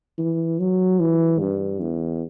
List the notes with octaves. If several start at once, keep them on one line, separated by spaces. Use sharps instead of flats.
E3
F#3
E3
G2
E2